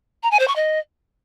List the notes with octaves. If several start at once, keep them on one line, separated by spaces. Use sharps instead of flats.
A#5
G#5
C5
C#6
D#5